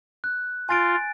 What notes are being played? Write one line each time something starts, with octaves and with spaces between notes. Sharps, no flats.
F#6
F4 G#5 A6 D7